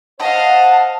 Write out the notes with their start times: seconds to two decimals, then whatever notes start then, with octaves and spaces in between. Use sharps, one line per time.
0.19 C5 D#5 F5 F#5 A5